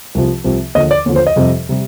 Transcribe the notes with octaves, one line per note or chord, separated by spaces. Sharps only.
C2 C3 F3
C2 C3 F3
D#2 D3 F3 D#5
D5
D#2 D3 F3
C5
D#5
F2 C3 G3
C3 G3